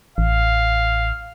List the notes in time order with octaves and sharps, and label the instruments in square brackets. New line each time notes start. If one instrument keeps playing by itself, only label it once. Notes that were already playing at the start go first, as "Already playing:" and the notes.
[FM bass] A1 [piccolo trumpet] F5